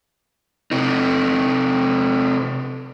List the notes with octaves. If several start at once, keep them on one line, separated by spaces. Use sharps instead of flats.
C3 D#4